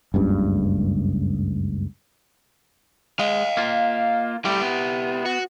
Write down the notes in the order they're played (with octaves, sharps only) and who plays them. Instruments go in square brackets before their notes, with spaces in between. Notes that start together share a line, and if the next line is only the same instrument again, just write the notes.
[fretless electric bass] F#1 C#2 G2
[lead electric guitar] G#3 [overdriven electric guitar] D#5 F5
[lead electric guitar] A#3 F4
[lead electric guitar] G3 A3 [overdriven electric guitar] E4 G4
[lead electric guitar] B3
[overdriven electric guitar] F#4